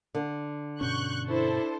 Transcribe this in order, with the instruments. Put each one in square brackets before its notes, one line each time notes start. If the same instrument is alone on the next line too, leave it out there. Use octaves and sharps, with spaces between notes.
[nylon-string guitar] D3
[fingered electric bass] G2 B2 C#4 [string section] C#6 F#6 G6
[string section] D4 A4 C5 [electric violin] E4